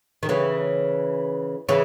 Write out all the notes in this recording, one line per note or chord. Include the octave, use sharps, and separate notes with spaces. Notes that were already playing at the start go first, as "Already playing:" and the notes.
D#3
C#3 E3
C#3 E3